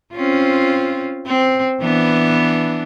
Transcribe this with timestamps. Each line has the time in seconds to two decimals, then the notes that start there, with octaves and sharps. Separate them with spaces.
0.14 C4 C#4 F4
1.27 C4
1.80 E3 B3 D4